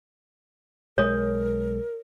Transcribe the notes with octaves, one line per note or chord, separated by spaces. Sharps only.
B1 G#3 A#4 C#5 D#6